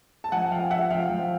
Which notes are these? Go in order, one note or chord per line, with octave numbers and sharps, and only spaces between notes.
A5
F3 F#5 G#5
F3 F5 G5
F3 E5 F#5
F3 F5 G5
F3